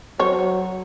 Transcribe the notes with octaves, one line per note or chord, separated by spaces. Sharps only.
F#3 C5 C#5